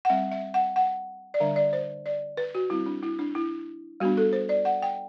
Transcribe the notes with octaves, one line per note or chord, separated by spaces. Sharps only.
F#5
G3 C4 E5
E5
F#5
F#5
D5
D3 G3 D4 E5
D5
C5
D5
B4
F#4
G3 C4 E4
D4
E4
D4
E4
G3 B3 D4 F#4
A4
C5
D5
F#5
G5